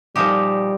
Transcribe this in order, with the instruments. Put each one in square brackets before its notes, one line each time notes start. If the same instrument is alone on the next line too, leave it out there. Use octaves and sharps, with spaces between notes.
[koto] A#2 F3 D#4 G4 [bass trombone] G3